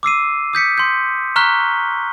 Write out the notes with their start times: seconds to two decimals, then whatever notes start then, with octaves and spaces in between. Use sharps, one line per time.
0.03 D6 E6 C7 D#7
0.53 D#6 G6 B6 C#7
0.78 C6 G6
1.36 A#5 C#6 F6 F#6 B6 G7